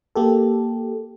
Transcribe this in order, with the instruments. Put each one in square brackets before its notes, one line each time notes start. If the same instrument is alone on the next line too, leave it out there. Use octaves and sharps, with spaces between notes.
[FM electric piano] A#3 G4 A4